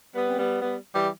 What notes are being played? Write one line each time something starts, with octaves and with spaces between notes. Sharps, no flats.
G3 B3
C4
G3 B3
G3 B3
E3 G3